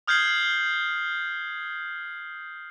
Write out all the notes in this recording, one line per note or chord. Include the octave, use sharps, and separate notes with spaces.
D#6 F6 G6 G#6 C7 F#7